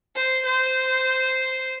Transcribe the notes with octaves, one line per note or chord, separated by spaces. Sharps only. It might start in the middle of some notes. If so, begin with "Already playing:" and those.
C5
C5